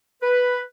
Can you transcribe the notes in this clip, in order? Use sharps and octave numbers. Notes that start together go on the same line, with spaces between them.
B4